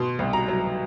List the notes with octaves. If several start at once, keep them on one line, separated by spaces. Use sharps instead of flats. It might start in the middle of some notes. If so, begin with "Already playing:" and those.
Already playing: B2 C6
C2
A#5
F#3